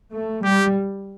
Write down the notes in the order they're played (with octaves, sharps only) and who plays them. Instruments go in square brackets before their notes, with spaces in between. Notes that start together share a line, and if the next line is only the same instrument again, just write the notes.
[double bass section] A3
[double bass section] G3 [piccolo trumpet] G4